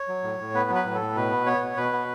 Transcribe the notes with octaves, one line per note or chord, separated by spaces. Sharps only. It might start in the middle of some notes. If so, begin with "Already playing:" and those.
Already playing: C#5
F#3
A2
A2
B3 B4
F#3
B4
A2
A4
A2
B2 B4
B3
B3 C#5
B2
B2 B4
B3